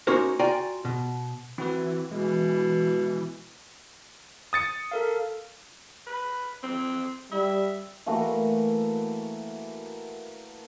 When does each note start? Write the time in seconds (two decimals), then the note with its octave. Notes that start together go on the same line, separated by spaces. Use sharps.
0.07 A#3 C#4 D#4 F#4 A#4 C5
0.39 F4 F#4 D5 G5 G#5 A#5
0.85 B2
1.58 E3 C4 F#4 B4
2.12 B2 G#3
4.53 D#6 A6 C#7
4.92 A4 A#4 F5
6.07 B4
6.63 C4
7.32 G3 E5
8.06 E3 A3 A#3 F#4